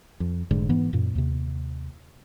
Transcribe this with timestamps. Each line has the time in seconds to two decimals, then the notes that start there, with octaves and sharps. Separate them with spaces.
0.20 F2
0.51 F1 G#2 D3
0.69 G#2 E3 B3
0.93 F#2 A#2
1.15 D#2 C3